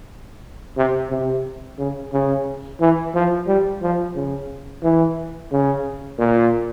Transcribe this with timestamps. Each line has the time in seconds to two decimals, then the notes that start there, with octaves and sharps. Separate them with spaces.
0.77 C3
1.10 C3
1.78 C#3
2.13 C#3
2.80 E3
3.14 F3
3.47 G3
3.82 F3
4.15 C#3
4.83 E3
5.52 C#3
6.18 A#2